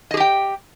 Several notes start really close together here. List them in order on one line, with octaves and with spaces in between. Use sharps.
D#5 G#4 G4 G5